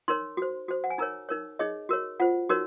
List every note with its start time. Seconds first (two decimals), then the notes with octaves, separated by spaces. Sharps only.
0.08 D#4 A#4 C#5 C6
0.37 F#4 C5
0.68 F#4 C5
0.84 F#5
0.90 G#5
0.98 D#4 A#4 C#5 A#5
1.29 D#4 A#4 C#5
1.59 D#4 G#4 C#5 D#5
1.89 F#4 A#4 C#5
2.20 F4 C5 F#5
2.49 D#4 F#4 A#4 C#5